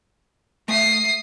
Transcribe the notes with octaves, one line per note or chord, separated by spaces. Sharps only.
A3 E5 D#6 C7